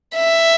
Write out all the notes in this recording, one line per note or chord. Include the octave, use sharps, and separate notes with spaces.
E5